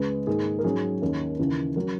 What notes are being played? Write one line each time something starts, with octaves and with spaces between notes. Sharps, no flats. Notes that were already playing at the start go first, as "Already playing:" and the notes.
Already playing: C#2 C#3 G#3 B4
G#2 D#3 A#3 G#4
A#4
G#2 F#3 C#4 G#4
D#2 D#3 A#3 C#4
D#2 C#3 E3 A#3
F#3 C#4 A#4